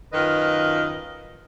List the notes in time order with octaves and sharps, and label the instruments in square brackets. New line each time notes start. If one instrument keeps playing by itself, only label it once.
[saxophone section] F#2 D#3 F4 A#4 B4 D#5